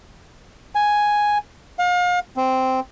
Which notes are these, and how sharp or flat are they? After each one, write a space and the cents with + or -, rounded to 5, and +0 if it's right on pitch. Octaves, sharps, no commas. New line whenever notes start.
G#5 +0
F5 +35
C4 -5